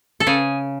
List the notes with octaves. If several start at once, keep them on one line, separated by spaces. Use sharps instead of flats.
A4
C#3 G#4